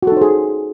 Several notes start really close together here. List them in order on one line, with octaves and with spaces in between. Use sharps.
F#4 A4 D#4 C5 G#4